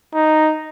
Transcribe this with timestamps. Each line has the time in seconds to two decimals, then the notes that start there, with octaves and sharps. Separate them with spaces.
0.14 D#4